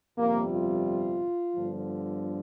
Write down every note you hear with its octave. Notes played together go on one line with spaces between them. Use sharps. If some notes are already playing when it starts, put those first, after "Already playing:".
G1 F2 C3 G3 A#3
F4
G1 G2 D3 F3